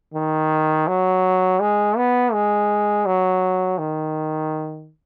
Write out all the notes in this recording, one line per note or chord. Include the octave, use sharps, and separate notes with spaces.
D#3
F#3
G#3
B3
G#3
F#3
D#3